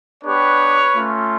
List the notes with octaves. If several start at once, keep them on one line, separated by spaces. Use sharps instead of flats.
B3 D4 G4 B4 C#5
A3 C#4 F4